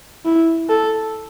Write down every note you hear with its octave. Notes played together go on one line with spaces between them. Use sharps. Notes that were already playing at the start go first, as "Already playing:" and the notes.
E4
A4